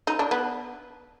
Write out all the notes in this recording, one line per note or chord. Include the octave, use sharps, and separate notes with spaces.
D#4
D4
B3